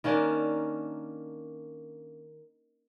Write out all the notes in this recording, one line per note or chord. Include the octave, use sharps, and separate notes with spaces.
D#3 A#3 C#4 D4